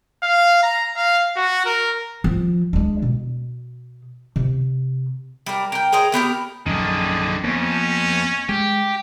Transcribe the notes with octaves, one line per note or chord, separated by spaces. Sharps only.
F5
A#5
F5
F#4
A#4
F3
G#3 D4
B2
C3
G3 A#4
A#4 G5
G#4 A#4 C5 D#5
A3 B3 G4 A#4
A#1 F#2 D3 D#3 G#4
F2 A#3 B3 C#4
G#3 G4